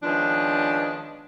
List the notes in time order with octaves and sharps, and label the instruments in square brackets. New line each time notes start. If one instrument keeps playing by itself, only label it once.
[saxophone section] D#3 F3 G#3 B3 C#4 D4